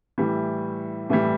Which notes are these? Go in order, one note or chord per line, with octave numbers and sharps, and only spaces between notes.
A2 E3 G3
A2 E3 G3